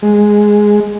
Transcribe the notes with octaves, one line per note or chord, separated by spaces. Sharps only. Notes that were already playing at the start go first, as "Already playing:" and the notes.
G#3